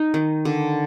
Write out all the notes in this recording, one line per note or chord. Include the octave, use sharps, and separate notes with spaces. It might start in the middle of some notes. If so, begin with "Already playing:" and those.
Already playing: D#4 D#5
D#3
D3